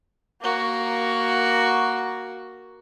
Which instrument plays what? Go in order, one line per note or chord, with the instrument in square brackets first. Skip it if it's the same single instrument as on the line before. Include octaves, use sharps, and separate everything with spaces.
[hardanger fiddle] A#3 F#4